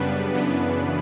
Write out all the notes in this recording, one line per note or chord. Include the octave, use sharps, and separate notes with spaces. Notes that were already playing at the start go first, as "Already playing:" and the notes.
Already playing: F#2 C#3 G3 B3 D4 B4
F#2 C#3 E3 B3 D4